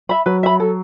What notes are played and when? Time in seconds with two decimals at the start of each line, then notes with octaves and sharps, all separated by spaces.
0.09 E5 B5
0.26 F#3 B4
0.43 E5 B5
0.60 A4